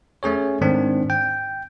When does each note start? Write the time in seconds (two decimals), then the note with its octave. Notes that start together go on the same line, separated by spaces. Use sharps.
0.23 A3 C#4 G#4 C#5
0.61 G#2 D#3 C4 D4
1.10 G5